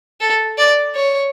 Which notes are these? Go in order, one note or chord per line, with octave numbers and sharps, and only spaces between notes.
A4
D5
C#5